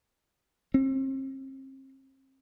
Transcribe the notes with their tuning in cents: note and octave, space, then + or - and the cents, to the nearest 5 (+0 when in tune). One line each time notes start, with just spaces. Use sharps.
C4 +40